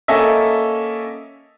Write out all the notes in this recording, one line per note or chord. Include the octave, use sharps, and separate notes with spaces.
A#3 C#4 A4 D#5 E5